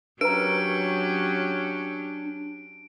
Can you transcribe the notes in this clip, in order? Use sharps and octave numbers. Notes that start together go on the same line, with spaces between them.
F#3 C#4 D4 G4 A#4 B4 A#5 D7